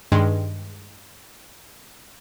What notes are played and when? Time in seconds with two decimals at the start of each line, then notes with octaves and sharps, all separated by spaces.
0.12 G2 D#3 G#3